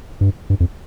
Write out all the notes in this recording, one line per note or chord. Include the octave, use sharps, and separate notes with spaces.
G2
G2
F2